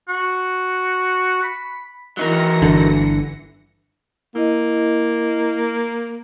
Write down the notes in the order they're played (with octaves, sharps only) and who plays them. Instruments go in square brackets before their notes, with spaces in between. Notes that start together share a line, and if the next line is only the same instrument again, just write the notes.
[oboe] F#4
B5
[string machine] E3 A#6 C#7 [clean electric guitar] F#3 D#4 A#4
[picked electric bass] G1 D3
[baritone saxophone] A#3 [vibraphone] E4 D#5